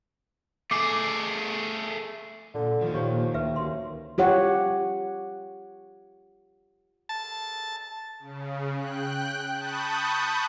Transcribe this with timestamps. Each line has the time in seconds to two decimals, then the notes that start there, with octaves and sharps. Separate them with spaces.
0.71 A3 G#4 D6 C7
2.54 A#2 D3
2.81 D#3 F3 A#3
2.94 A#2 F3 G4 C#5
3.34 D2 B4 E5
3.56 F#2 C6
4.18 F4 G4 C#5 F#5
7.09 A5
8.19 C#3
8.76 G5 F#6
9.54 A5 B5 C#6 D#6 F#6 G6